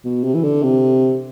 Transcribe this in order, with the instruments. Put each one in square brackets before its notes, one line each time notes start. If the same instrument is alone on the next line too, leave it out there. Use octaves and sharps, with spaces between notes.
[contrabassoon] B2
C3
E3
D3
C3